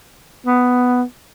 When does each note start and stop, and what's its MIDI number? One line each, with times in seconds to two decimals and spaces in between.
0.47 1.02 59